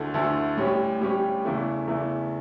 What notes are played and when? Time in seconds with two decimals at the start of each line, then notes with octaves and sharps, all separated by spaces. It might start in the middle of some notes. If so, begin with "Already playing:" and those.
Already playing: D2 D3 A3 E4 A4
0.14 D2 D3 A3 E4 A4
0.57 A2 G3 C#4 G4 C#5
1.01 A2 G3 C#4 G4 C#5
1.44 E2 C#3 E3 A3 E4
1.87 E2 C#3 E3 A3 E4